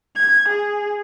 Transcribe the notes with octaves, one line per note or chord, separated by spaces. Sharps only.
G#6
G#4